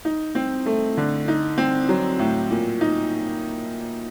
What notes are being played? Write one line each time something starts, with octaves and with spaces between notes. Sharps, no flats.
D#4
C4
A3
D3
D#4
C4
F#3
A2
A#2
D#4